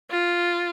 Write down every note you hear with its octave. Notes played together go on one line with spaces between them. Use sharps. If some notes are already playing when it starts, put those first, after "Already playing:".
F4